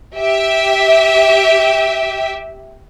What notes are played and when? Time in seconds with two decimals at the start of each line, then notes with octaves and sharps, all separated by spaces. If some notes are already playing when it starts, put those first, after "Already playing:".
0.17 G4 E5